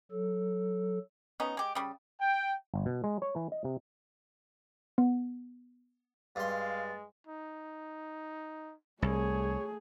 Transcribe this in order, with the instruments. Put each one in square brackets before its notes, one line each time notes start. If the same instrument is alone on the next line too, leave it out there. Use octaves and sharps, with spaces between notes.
[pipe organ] F#3 A4
[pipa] B3 C#4 D#4
G#3 G4
C#3 G3
[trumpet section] G5
[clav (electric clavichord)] G1
B2
G#3
C#5
E3
D#5
C3
[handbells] B3
[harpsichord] G2 C6 [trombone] G#3 [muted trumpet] F5 [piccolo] A6
[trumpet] D#4
[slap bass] C2 [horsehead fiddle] A3 G#4 [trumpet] C#5